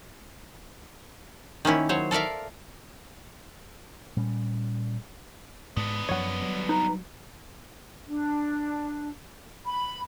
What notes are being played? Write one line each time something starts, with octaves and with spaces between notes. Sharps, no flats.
D#3 A#3 C#4 E4
F#3 C5 C#5
A4 A#4 D5 E5 F5
A#2 G3 C#4
G#2 B3 D4
F#2 F3 C#5 F#5
F#3 G3
D#4 B4 A#5
D4
B5